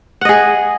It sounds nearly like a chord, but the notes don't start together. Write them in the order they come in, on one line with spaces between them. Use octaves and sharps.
F#5 D#5 G#4